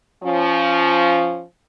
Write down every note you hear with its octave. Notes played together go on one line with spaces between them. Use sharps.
F3 C#4